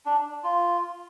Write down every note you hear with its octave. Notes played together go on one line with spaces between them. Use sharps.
D4
F4